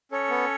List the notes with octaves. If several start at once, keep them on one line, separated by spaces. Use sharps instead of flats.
C#4 A4 C#5
B3